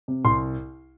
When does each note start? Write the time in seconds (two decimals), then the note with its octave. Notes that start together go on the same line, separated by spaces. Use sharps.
0.08 C3
0.25 C2 C6